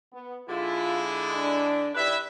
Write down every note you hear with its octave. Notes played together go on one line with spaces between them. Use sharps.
B3
D3 G#3 E4 F4
D4
D#3 E4 G4 B4 D5 E5